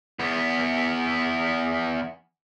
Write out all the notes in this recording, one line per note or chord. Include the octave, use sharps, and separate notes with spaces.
E2 B3